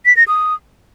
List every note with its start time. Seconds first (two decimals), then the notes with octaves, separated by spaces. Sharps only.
0.06 B6
0.17 A#6
0.28 D#6